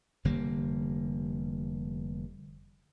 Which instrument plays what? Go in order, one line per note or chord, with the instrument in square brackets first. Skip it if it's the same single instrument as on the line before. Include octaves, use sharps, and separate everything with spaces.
[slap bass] F1 D3 G3 A#3